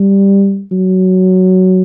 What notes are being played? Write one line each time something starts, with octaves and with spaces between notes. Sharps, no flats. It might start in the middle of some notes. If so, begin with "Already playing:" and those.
Already playing: G3
F#3